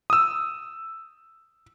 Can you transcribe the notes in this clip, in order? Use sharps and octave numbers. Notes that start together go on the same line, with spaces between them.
D#6 E6